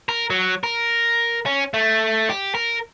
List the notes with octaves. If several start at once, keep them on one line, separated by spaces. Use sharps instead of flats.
A#4
F#3
A#4
C#4
A3
G4
A#4